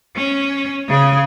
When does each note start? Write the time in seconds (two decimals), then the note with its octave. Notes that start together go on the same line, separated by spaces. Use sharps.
0.16 C#4
0.88 C#3 G#4